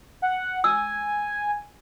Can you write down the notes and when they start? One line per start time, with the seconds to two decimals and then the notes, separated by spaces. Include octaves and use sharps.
0.22 F#5
0.64 G#5 E6